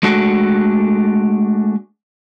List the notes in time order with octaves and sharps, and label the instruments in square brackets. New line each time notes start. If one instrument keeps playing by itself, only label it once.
[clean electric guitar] G#3 A3 D4 F#4 A4